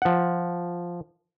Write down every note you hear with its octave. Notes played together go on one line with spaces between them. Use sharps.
F3 F#5